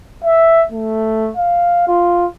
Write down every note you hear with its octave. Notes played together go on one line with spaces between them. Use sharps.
E5
A3
F5
F4